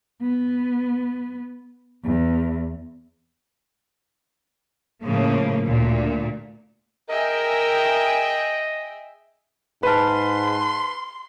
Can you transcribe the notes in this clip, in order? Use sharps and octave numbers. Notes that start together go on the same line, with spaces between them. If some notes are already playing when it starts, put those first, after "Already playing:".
B3
E2
A2 C#3 F3 A#3
D2 A#2
G#4 A#4 D#5 E5 G5
G#2 B4 A5 B5 C6 F6